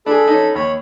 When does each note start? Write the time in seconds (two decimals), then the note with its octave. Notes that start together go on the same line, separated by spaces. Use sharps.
0.06 D4 G#4 A4 B5
0.28 C#4 D#4
0.55 D#2 C#5 B5